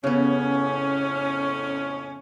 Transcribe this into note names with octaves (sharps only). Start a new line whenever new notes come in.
F2 A2 C#3 B3 C#4